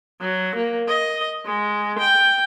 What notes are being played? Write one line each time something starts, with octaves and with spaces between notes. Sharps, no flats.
F#3
A#3
D#5
G#3
G5